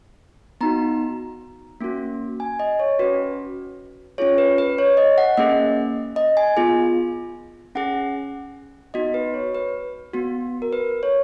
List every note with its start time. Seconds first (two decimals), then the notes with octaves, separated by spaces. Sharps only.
0.61 B3 D#4 F#4 A#5
1.80 A#3 C#4 F#4
2.40 G#5
2.60 D#5
2.80 C#5
2.99 C#4 F#4 B4
4.18 C#4 F4 G#4 C#5
4.38 B4
4.58 B4
4.78 C#5
4.97 D#5
5.18 F#5
5.37 A#3 C#4 G#4 D#5
6.16 D#5
6.37 G#5
6.57 B3 F4 G#4
7.75 C#4 G#4 F#5
8.94 B3 D#4 F#4 D#5
9.14 B4
9.34 C#5
9.55 B4
10.13 B3 F#4
10.62 A#4
10.73 B4
11.03 C#5